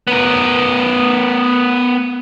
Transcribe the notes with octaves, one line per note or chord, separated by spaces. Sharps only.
B3 A#4